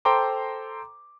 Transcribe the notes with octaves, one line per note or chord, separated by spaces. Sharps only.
A4 C5 G5 A#5 C6 D6